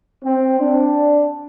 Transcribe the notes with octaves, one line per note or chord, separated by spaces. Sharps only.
C4
D4